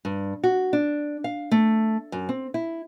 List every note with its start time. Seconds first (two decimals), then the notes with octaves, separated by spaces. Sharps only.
0.05 G2
0.44 F#4
0.73 D4
1.24 F5
1.51 A3
2.12 F#2
2.29 C4
2.54 E4